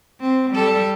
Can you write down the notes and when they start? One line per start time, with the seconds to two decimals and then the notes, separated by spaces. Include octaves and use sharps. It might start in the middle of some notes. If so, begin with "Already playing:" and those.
0.21 C4
0.51 G3 A4